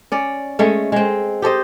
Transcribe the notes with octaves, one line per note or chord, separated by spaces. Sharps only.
C#4 D5
G#3 A3 C#4
G#3 C4
G4 A4 C5 D#5